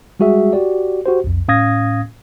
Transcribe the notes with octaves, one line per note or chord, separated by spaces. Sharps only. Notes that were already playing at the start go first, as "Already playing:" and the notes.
G3 G#3 F#4 G#4 E5
F#4 G4 D5
F#4 G4 C5
B1 F2
A2 C#4 F5 D#6 G#6 A#6